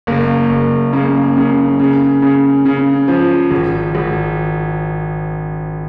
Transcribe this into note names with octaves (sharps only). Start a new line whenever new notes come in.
F#1 A#3
F#1
C#3 A#3
C#3
C#3
C#3
C#3
F3
G#1
G#1